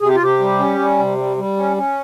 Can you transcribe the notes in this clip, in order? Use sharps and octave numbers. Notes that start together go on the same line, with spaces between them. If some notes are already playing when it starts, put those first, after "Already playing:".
C3 G#4
G4
F4
C3 G4
G3
C#4
G3
C3
G3
G3
C#4
C#4